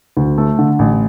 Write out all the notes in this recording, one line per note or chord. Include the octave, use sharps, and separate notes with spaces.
D2
A3
D3
A1